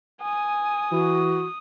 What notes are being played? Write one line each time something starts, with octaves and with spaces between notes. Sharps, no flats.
G#5 D#6
E3 F#4